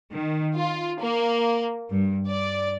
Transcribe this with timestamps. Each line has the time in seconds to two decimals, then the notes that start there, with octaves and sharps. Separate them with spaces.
0.12 D#3
0.56 F4
1.01 A#3
1.90 G2
2.28 D5